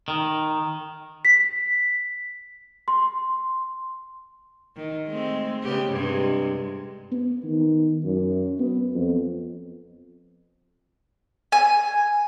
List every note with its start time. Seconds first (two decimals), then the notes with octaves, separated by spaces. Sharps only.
0.08 D#3
1.25 B6
2.88 C6
4.76 D#3
5.07 G#3 A3 C4
5.63 C#3 B3 G4
5.91 G2 C3 G#3
7.12 B3
7.44 D#3
8.05 F#2
8.60 B3
8.95 F2
11.52 G#5